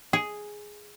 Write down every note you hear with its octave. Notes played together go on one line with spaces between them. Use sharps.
G#4